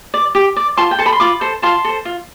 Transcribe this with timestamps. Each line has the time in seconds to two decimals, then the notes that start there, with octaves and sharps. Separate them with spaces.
0.14 D5
0.35 G4
0.56 D5
0.77 F4 A5 C6
0.91 G5
0.99 A4 C5 A5
1.06 B5
1.12 C6
1.20 F4 B5 D6
1.41 A4 C5
1.62 F4 A5 C6
1.85 A4 C5
2.05 F4